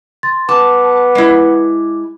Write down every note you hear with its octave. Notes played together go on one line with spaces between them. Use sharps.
C6 A6
B3 A5 D6
G#3 E4